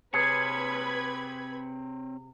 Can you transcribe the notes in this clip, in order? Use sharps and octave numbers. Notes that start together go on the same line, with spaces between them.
C3 C4 G#4 B4 C#5 B5 G#6 C#7